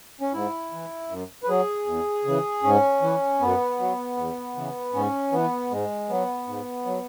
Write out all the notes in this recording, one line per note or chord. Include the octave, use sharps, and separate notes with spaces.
C#4
G#2 E4
E3
F#2
B4
F#3 G#4
E2
C#3 E3
G#2 C#4
E3
F#2 B3
F#3
E2
C#3 E3
G#2 C#4
E3 B3
G#2 G#3
F#3 B3
G#2
F#3